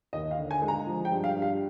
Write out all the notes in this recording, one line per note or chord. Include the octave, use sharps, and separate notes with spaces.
D#2 D#5
F5
D3
G#5
G#3
A#5
F3
G5
G2
F5
G2
F5